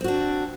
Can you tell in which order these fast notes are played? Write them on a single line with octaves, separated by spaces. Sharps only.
C4 F#4 D4